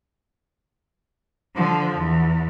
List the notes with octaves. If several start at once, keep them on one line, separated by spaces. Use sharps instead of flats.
D3 F3
E2